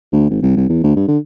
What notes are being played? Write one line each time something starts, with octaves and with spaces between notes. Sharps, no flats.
D2
G#1
C2
C2
E2
D2
G2
D3